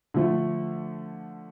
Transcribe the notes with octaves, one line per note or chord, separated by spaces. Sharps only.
D3 F3 A3